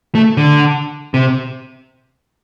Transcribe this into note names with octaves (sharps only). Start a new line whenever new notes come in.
A3
D3
C3